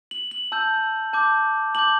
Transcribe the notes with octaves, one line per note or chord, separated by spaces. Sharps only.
F#7
F#7
A5 E6 G6
A5 D6 G6
A5 D6 G6 F#7